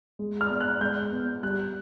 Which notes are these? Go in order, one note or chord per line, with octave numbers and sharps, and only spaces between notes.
G#3
F6
B3
F#6
G#3 G6
B3
G3 F#6